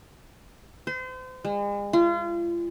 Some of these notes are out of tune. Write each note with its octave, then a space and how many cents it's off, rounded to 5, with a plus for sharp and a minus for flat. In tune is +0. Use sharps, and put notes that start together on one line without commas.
C5 -35
G#3 -40
F4 -35